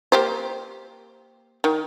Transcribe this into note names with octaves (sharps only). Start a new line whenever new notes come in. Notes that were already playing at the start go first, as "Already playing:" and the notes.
A#3 G4 C5
D#3